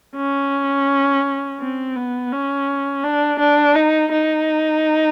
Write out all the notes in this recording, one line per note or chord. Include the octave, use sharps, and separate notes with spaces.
C#4
C4
B3
C#4
D4
D4
D#4
D#4